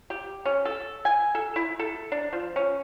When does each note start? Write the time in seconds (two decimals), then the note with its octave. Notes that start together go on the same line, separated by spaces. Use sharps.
0.10 G4
0.45 C#4
0.65 A4
1.05 G#5
1.35 A4
1.56 E4
1.79 A4
2.12 D4
2.33 F3
2.56 C#4